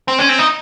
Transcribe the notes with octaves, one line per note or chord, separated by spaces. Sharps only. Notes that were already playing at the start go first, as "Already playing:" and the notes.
C4
C#4
C4
D#4